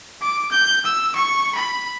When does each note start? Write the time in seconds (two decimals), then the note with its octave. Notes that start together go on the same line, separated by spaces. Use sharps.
0.22 D6
0.52 G6
0.86 E6
1.15 C#6
1.55 B5